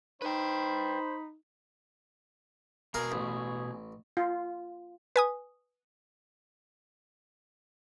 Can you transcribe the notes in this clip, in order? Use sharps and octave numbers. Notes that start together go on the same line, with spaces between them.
D#4 B4 C5 G5 B5
B2 G#4 A#4 F5 A#5
A1
F4
B4 G#5 D#6